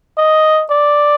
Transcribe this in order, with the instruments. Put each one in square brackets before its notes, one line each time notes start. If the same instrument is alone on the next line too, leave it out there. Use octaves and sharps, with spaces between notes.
[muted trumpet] D#5
D5